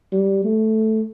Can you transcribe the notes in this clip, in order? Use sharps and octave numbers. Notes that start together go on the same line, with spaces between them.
G3
A3